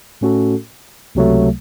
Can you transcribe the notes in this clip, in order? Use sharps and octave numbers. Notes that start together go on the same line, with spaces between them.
A2 A3 C#4 F#4 A4
C#2 C3 F#3 A3